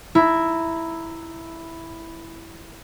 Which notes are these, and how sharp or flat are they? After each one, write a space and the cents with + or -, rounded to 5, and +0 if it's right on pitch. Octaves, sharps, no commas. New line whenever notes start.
E4 +0 A#5 -15